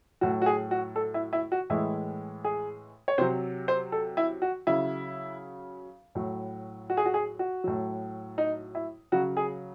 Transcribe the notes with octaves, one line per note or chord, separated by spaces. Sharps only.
A2 F#3 F#4
F#4
G#4
F#4
A4
E4
E4
F#4
A2 E3 G#3 E4
G#4
C#5
C3 F#3 C5
C5
A4
E4
F#4
C#3 F#3 E4
A2 F#3
F#4
G#4
F#4
G#4
F#4
A2 F#3
D#4
E4
C#3 F#3 F#4
G#4